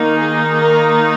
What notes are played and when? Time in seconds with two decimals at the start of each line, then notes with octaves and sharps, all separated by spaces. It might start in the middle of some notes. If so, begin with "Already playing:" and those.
Already playing: D#3 A#3 D#4
0.17 G#4
0.62 A#4